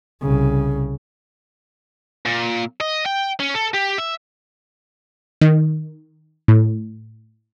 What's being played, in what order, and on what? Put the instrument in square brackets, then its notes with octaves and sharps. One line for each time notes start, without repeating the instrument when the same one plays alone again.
[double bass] C2 C#3
[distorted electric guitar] A#2
D#5
G5
C#4
A4
G4
E5
[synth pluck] D#3
A2